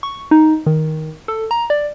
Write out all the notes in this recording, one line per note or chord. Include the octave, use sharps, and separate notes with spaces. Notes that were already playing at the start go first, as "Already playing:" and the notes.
C#6
D#4
D#3
A4
A#5
D5